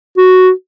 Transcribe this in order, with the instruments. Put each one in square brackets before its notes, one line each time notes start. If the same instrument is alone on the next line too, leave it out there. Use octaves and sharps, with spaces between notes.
[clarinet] F#4